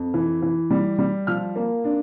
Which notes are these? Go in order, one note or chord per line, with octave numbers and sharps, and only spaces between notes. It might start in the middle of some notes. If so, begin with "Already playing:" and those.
Already playing: F2
E3
E3
G3
G3
F3 F6
A#3
D4